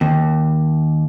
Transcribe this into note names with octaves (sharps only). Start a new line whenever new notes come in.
D#2